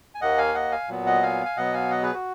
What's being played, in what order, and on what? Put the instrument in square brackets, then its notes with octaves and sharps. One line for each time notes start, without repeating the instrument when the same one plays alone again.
[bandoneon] G#5
D#2 D#3 A#3 D#5 F#5
F5 G#5
D#5 F#5
F5 G#5
A#2 F#3 B3
D#5 F#5
F5 G#5
G#5
B2 F#3 B3 D#5 F#5
F5 G#5
D#5 F#5
G#4 B4
F#4